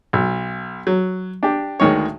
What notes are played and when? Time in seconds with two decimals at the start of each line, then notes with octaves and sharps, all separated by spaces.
0.13 B1
0.87 F#3
1.43 D4 G4
1.80 D2 D#3 G#3 C#5